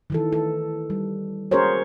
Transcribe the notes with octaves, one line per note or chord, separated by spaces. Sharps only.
D#3 E3 A4
A4
G3
C#4 F#4 G#4 A#4 C5 C#5